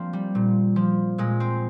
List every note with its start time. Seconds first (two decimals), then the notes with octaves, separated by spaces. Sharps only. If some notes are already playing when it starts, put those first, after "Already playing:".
Already playing: F3 A#3 C4 D4
0.13 G3
0.35 A#2
0.76 F3
1.18 A#2 G#3
1.40 C4